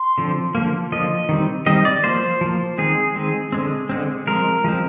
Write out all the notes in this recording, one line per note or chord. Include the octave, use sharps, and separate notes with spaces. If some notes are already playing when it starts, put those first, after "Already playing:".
Already playing: C6
D3 F3 C4
D3 F3 A#3
D3 F3 A#3 D#5
D#3 G3 C4
D#3 G3 C4 D#5
D5
F3 A#3 C5
F3 A#3
D#3 G#3 C4 G#4
D#3 G#3 C4
D3 G#3 C4
D3 G#3 C4
F3 G#3 C4 A#4
F3 G#3 C4